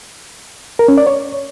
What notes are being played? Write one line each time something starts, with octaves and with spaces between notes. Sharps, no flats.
A#4
C#4
D5
C#5